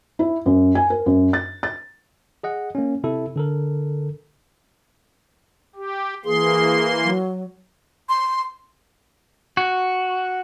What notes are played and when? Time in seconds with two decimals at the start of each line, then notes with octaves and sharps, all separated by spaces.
0.19 E4
0.46 F#2
0.75 G#5
0.90 A#4
1.06 F#2
1.33 A6
1.63 A6
2.43 G#4 D#5 F#5
2.75 A#3 C#4
3.04 C3 E4 A4
3.36 D3 A4 A#4
5.75 G4
6.25 E3 A#3 G#4 C6
7.04 F#3
8.09 C6
9.57 F#4